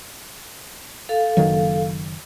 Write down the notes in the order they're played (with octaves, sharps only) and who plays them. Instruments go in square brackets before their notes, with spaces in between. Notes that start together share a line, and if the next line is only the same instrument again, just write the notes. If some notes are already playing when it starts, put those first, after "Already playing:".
[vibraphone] A4 F5
[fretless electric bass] F#1 D#3 F#3